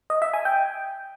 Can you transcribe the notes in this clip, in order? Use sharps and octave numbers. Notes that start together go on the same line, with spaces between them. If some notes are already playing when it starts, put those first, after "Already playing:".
D#5
E5
G#5
G5